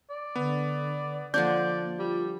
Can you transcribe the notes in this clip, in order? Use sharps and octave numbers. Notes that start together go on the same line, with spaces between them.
D5
D3 B3
D3 F3 A#3 D4 D5 G6
G3 F4